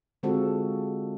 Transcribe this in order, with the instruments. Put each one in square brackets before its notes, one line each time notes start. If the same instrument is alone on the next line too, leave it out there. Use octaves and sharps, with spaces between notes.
[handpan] D3 G#3 C4 F4 F#4 A4